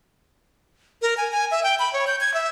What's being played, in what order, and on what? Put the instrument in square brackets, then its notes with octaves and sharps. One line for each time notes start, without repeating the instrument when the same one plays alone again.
[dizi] A#4
G#5
G#5
E5
G5
B5
C#5
G6
G#6
E5